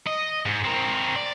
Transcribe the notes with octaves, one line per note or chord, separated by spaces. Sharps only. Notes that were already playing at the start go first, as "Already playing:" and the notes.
D#5
G#2
C4 A#4
D5